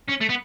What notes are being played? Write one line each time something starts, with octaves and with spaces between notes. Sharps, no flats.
C#4
A3
B3